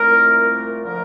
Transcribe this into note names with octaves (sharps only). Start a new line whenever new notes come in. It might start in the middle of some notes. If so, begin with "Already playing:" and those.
Already playing: C2 A#2 A3 A#4
D3 F3 A3 A#4